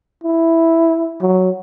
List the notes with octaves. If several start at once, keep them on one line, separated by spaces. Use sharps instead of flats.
E4
F#3